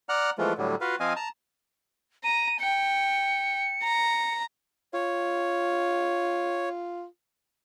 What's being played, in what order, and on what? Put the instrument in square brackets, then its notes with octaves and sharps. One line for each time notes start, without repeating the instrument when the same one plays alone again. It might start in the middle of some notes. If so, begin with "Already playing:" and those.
[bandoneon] D5 F#5 A#5 F6 F#6
E3 F3 G#3 A3 B3 F4
A2 D3 F#3 G3
F4 F#4 B4 F5
F3 C4 D#5 F5 G#5
A5 A#5
[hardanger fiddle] A#5 [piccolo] D#7
[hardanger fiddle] G5 [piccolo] C#7
[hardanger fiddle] A#5
[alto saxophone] F4 [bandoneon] C#5